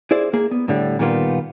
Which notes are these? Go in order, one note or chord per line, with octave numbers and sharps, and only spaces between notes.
E4 G#4 C5 D5
A#3 G#4
B3
A2 D3 G3
A#2 D#3 G3 A#3 B3 F4